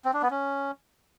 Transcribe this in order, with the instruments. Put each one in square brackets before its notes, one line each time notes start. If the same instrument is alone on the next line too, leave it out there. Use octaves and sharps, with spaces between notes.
[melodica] C4
D4
B3
C#4